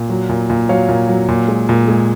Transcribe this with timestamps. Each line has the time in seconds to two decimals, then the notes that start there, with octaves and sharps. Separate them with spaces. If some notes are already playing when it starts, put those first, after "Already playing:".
Already playing: A#2
0.09 F#3
0.29 A#2
0.50 A#2
0.69 F#3 C#5 F5
0.89 A#2
1.09 F#3
1.29 A#2
1.48 G#3
1.69 A#2
1.88 G#3